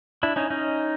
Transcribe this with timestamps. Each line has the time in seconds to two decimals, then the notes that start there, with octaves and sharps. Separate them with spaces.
0.23 D4 E4
0.36 C#4 D#4
0.50 C#4 D#4